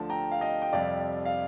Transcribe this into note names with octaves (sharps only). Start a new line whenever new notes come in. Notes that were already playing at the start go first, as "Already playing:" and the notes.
Already playing: D2 D3 F3 A5
G5 A#5
F5
D#5 G5
G5
F2 C3 G3 D5 F5
F5